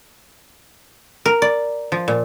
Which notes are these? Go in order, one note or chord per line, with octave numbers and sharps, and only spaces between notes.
A#4
D5
F3
A#2